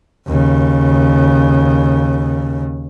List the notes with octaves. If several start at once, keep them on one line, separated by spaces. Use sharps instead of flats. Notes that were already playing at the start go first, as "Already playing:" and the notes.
D#2 C#3